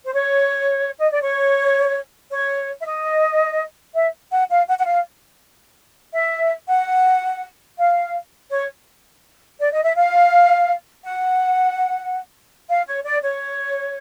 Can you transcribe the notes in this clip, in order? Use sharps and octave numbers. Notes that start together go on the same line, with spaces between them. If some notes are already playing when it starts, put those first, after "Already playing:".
C5
C#5
D#5
D5
C#5
C#5
E5
D#5
E5
F#5
F5
F#5
F#5
F5
E5
F#5
F5
C#5
D5
D#5
E5
F5
F#5
F5
C#5
D5
C#5